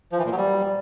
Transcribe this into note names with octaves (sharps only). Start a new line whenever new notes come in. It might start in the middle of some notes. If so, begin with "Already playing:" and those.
F3
E3
A#2
F#3
G3